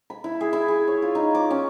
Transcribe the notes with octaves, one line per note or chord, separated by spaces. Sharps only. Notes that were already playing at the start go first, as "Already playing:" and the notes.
B5
E4
G#4
E4
G#4
C#5
F4
D#4
D6
C#4